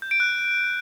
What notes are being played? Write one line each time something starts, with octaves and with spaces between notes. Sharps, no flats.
G6
D7
F#6